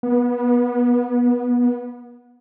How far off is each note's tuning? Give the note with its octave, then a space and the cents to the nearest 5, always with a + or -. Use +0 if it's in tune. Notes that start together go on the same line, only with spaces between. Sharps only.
B3 -25